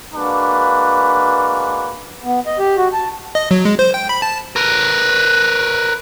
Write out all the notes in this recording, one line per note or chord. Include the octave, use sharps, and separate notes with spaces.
G#3 A#3 D4 F#4 B4
B3
D#5
G4
F#4
A5
D#5
F#3
G#3
C5
G5
B5
A5
A#4 B4